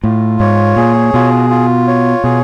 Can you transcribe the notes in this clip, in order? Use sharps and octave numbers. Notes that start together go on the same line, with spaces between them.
A2 F4
G#2 C#5
A#2 G#4
B2 F4
F4
C#5
B2 G#4